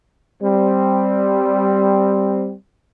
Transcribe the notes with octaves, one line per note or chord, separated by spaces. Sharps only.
G3 C4